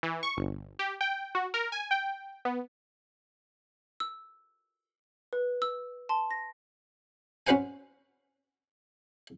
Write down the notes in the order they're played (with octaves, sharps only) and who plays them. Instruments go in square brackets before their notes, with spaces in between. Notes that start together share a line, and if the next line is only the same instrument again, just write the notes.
[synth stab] E3
C#6
G1
G4
G5
F#4
A#4
G#5
G5
B3
[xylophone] E6
B4
E6
A5 C6
A#6
[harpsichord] C#4 F#4 B4 C5 F#5 G#5